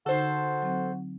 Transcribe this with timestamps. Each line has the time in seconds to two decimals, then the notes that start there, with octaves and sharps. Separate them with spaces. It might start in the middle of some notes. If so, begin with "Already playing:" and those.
0.06 D3 D#4 F#4 A4 C5
0.62 F#3 C4